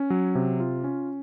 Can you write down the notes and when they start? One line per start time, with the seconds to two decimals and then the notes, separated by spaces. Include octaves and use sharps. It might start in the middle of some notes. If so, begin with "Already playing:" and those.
Already playing: C#4
0.10 F#3
0.35 C3
0.60 F4
0.84 C#4